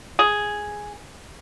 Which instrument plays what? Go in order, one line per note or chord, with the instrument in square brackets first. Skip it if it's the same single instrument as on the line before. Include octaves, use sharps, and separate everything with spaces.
[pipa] G#4